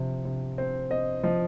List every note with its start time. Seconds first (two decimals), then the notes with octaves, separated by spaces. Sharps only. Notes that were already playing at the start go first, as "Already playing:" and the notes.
Already playing: C3 F3
0.25 C3
0.58 C4
0.90 C4 D#5
1.23 F3 D#5